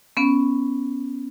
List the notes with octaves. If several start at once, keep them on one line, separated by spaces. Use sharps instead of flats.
B3 C#4